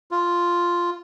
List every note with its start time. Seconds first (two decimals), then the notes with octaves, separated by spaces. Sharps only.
0.11 F4